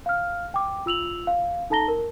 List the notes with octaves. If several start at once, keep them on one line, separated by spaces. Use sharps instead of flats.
F5 F6
G5 D6
F4 E6 F7 F#7
F5
D#4 A4 A5 A#5 A#6 G7
A#4